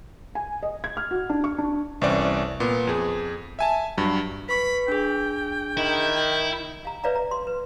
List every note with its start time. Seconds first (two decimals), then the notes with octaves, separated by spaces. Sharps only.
0.35 G#5
0.63 D#5
0.84 G#6
0.97 F6
1.11 F#4
1.29 D4
1.44 C#6
1.58 D4
2.01 C2 E3 C4 C#4 D5
2.60 A#2 B3
2.87 F2 G#4
3.59 E5 G#5 A5
3.97 G2 F#3
4.49 B4 B5 C#6
4.88 D4 G#4 G5
5.77 D#3 E4
6.85 F5 A#5
7.04 B4 C#5 D5 E5 F5 A#5
7.15 A#5
7.31 C6
7.47 B4